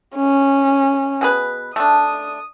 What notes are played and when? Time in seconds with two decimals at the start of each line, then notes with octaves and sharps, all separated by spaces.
0.16 C#4
1.21 B2 G#4 B4
1.76 A3 D4 D#6